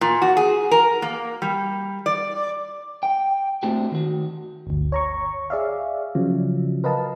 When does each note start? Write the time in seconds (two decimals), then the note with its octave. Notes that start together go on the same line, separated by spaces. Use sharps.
0.01 A#2
0.22 F#4
0.37 G#4
0.71 A#4
1.02 A#3
1.42 G3
2.06 D5
3.03 G5
3.63 A3 C4 D4 F#4 G4
3.92 D#3 F#4
4.67 G1 D2
4.92 C#5 A#5 C#6
5.50 G#4 D5 E5 F5
6.15 C#3 F3 F#3
6.84 A#4 B4 D#5 F5 A5